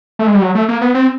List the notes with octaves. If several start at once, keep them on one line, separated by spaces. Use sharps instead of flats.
A3
G#3
G3
F#3
A3
A#3
B3
C4